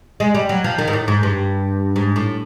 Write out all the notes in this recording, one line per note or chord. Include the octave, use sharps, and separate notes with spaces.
G#3
G3
F#3
F3
D#3
G#2
A2
G#2
G2
G#2
A2